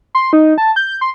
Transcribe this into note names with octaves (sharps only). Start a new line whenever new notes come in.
C6
D#4
A5
G6
C6